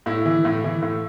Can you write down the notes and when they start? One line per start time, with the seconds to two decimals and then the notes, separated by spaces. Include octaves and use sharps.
0.06 A2 E4
0.26 E3
0.45 A2
0.64 E3
0.82 A2